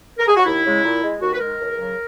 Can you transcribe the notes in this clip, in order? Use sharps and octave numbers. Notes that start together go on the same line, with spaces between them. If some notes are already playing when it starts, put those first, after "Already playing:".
A#4
G#4
F#4
D#2 E4
C#3 G#3
A#2
G#3
D#2 F#4
B4
D#3 G#3 A#4
C#2
C#3 F#3